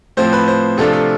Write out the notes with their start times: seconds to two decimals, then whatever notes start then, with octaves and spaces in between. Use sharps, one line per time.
0.17 A2 F3 C4 C5
0.33 B4
0.48 C5
0.77 C3 F3 A3 D4 F4 A4
0.93 A4